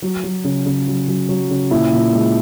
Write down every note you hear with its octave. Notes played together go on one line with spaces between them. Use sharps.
F#3
F#3
C#3
C#3
F#3
F#3
F#3
C#3
A#2 E4
A#2
G#3